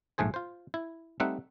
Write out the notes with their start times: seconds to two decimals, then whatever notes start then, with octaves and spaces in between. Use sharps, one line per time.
0.18 A#1 G#2 A3 G#4 C5
0.34 F4 C5
0.74 E4
1.20 G3 A3 C4 D#4 E5 F#5